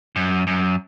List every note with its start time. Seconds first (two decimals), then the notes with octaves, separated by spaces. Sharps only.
0.16 F#2
0.47 F#2